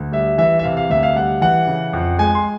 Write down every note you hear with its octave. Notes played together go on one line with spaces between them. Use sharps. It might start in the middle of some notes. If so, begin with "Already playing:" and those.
Already playing: D2
G3 E5
E3 E5
E5
C3 F5
F5
D2 E5
F5
G3 F#5
E3 F#5
C#3
F2
G#3 G#5
C6